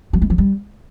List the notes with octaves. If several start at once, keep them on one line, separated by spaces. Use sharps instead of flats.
F#3
A3
F3
G3